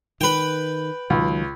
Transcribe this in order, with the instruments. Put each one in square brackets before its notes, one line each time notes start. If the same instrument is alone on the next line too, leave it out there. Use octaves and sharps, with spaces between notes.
[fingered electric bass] D#3 [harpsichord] B4 G5
[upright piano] C#2 [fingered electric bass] D#3 F#3